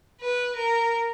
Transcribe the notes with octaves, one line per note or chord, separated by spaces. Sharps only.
B4
A#4